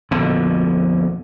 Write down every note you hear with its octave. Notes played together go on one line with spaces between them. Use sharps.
A#1 F2 B2 D3